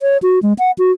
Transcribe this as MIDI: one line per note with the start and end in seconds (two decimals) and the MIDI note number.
0.02 0.17 73
0.23 0.39 66
0.43 0.53 56
0.59 0.71 78
0.78 0.92 66